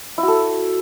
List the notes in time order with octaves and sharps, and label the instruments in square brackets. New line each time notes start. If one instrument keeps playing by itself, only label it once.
[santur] E4
F#4
A4